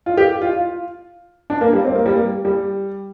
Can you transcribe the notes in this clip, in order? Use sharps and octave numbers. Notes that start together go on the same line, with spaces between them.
F4
G4
F4
F4
D4
A#3
G3
C4
A#3
G3
A#3
G3